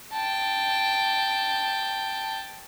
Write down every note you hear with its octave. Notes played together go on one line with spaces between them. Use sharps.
G5 A5